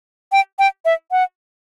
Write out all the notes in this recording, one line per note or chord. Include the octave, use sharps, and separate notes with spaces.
G5
G5
E5
F#5